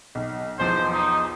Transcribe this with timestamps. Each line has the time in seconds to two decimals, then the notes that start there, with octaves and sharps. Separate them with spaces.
0.15 B1
0.59 B1 E2 F3 C5
0.92 D#4